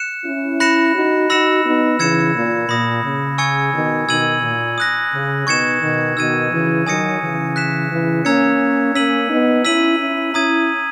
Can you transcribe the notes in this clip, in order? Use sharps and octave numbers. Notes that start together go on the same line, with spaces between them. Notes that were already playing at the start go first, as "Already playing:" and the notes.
Already playing: F#6 C#7 E7
C#4 E4
B5 F#6 A#6 C#7 E7
D#4 F#4
D#4 F#4 B5 E6 A#6 C#7 E7
B3 D#4
C#3 E3 E6 G#6 C#7 E7
A#2
A#2 B5 D#6 A#6
C#3
G#5 C#6 E6 G#6 C#7
B2 D#3
B2 D#3 E6 G#6 D#7 F#7
A#2
D#6 F#6 A#6
C#3
B2 D#3 C#6 G#6 C#7 E7
B2 D#3
B2 D#3 E6 G#6 D#7
C#3 E3
D#3 F#3 G#5 D#6 A#6 C#7
C#3 E3
F#6 B6 E7
C#3 E3
A#3 C#4 A#5 E6 G#6 C#7
A#3 C#4 E6 B6 D#7 F#7
B3 D#4
C#4 E4 E6 B6 D#7 F#7
C#4 E4
C#4 E4 A#5 D#6 G#6 D#7